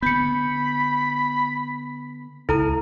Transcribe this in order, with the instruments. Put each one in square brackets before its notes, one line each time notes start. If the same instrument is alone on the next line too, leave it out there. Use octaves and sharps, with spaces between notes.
[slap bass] D3 B3 [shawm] B5 [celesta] G6 C#7
[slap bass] C#2 [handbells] E4 A#5 [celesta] A4